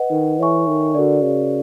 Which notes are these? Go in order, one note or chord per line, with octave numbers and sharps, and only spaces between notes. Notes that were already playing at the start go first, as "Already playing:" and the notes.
Already playing: B4 D#5 F#5
D#3
E3 A4 C#5 E5 G#5 C#6
D#3
D3 F#4 A#4 D5
C#3